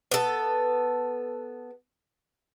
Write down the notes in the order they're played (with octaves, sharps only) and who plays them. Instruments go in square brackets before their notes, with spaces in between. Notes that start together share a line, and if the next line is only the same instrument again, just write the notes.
[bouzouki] B3 A4